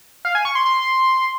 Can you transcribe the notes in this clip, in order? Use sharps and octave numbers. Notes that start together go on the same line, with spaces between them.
F5
G#5
C#6
C6
C6